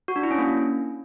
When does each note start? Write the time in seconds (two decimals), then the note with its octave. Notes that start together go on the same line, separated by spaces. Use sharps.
0.08 F#4
0.16 D4
0.23 E4
0.31 C#4
0.38 A#3